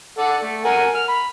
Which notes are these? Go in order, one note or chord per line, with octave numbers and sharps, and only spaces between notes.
A4 D5 F#5
A3
A#4 F#5 G#5
F6
B5